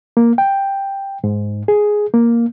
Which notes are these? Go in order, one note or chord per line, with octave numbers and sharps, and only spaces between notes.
A#3
G5
G#2
G#4
A#3